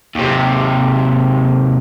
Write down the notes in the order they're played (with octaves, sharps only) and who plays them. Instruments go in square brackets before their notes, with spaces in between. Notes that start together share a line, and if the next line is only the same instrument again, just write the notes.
[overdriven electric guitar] D#2 C3